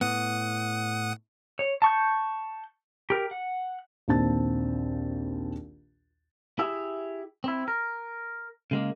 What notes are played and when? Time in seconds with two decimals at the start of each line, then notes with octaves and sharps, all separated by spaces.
0.01 A2 B3 F#5 D#6
1.59 C#5
1.82 A5 C#6 G6
3.10 G4 A#4
3.31 F#5
4.08 A#1 D#2 C4 A5 A6
6.59 E4 G4 G#4 E5
7.44 C4 E4
7.68 A#4
8.71 C#3 G#3 A#3